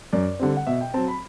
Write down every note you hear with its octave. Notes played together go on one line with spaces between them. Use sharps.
F#2 D5
D3 G3 C4
F#5
B2 E5
G5
F#3 C4 A5
B5